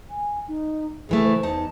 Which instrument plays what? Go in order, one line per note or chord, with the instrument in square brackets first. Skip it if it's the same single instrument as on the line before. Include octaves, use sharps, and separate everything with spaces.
[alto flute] G#5
D#4
[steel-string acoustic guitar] C#3 E3 A3 [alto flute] G#4
[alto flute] C5
[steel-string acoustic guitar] E2 D#4 A5